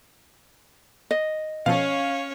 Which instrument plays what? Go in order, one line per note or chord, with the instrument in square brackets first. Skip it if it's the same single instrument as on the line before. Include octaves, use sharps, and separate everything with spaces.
[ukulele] D#5
[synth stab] B2 F3 A4 [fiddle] C#4 C#5 [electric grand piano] F5